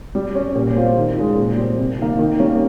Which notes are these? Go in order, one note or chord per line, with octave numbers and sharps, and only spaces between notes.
G3
C#4 G4
A#2
G3 C4 F4
D#3
G#3 C#4 F4
A#2
G3 C4
C3
D#3 A#3
D#3
G3 A#3 C#4